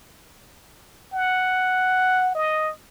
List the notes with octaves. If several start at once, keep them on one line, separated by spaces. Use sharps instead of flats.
F#5
D#5